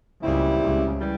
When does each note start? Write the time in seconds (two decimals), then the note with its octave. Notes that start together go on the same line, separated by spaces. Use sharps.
0.23 C#2 A#2 C#3 G3 C4 E4
0.62 C#2 C#3
1.00 E3 G3